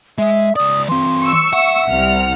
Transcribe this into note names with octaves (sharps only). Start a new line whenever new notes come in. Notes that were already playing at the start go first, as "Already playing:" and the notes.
G#3 E5
C#2 D5 D#6
E3 C4 C6
C#6 E6
E5 F#5
C2 F6